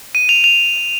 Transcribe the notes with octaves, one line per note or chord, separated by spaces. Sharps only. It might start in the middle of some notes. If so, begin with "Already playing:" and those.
D#7
F7
F7